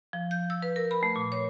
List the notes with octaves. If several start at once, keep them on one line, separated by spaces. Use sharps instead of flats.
F3
G6
E6
B4
A#4
B5
A3
A#2
C#5